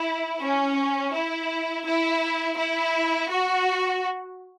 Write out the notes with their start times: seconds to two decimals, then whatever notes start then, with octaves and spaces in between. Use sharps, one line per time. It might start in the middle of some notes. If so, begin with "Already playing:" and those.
Already playing: E4
0.41 C#4
1.13 E4
1.85 E4
2.57 E4
3.29 F#4